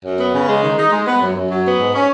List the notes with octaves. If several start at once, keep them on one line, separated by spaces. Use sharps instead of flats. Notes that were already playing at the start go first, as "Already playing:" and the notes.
F#2
B3
C#3
G#3
D#3
D#4
G#3
B3
F#2
F#2
F#3
B3
G#2
C#4